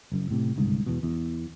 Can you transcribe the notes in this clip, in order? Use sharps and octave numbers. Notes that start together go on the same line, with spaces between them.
F#1 F#2
A2 C3
G1 C2 G#2 C#3
E2 B2
E2